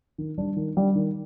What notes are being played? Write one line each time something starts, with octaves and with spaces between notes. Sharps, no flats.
D#3
G3 D4
D#3
G3 D4
D#3